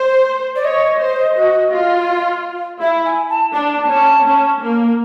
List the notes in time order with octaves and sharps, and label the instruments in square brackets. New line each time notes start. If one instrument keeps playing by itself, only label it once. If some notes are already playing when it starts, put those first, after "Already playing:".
Already playing: [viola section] C5
[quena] D5
[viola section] C#5 [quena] D#5
[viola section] C5
F#4
F4
[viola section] E4 [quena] E5
[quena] G#5
A5
[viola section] D4 [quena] A5
[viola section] C#4
C#4
A#3